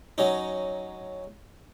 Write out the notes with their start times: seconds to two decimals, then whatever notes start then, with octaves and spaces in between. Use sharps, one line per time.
0.18 F#3 C#4 D#4